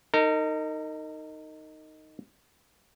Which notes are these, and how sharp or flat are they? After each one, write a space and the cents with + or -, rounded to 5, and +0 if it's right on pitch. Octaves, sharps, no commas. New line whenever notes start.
D#4 +0 A#4 -40